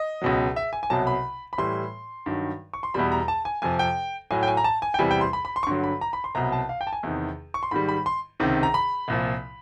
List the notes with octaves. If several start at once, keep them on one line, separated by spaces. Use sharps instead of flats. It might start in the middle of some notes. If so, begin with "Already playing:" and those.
Already playing: D#5
C#2 B2 F#3
E5
G#5
G#5
C2 B2 F#3 A5
B5
B5
A2 E3 G3 C6
G2 D#3 F#3
C#6
C6
E2 B2 G3 B5
A#5
A5
G#5
F2 C3 F3 G#5
G5
A2 F#3 G#5
G5
G#5
A#5
A5
G#5
G5
E2 C3 E3 G3 G#5
G5
C6
B5
B5
C6
C#6
G2 D3 F#3 C6
B5
A#5
B5
C6
C2 B2 F#3 A#5
A5
F5
G5
A5
G#5
E2 C3 D#3
C#6
C6
G#2 D#3 G3 B5
B5
C6
C#2 C3 D#3
A#5
B5
C2 A#2 F3